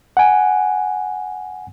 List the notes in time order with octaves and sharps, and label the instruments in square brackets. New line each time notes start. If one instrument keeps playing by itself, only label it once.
[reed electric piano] F#5 G#5